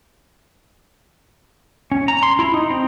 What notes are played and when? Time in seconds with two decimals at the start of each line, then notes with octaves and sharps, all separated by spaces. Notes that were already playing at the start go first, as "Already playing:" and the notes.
1.92 C#4
2.08 A#5
2.23 C6
2.39 E4
2.54 D#4
2.70 C4